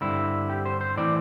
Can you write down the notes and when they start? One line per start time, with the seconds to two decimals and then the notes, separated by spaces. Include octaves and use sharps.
0.01 G2 D3 C4 E4
0.50 G4
0.66 C5
0.81 C5
0.96 A2 E3 C4 D5